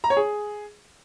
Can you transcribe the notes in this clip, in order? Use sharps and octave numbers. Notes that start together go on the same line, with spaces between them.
A#5
C#5
G#4